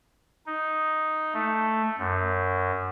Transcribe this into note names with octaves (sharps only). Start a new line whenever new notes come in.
D#4
A3
F#2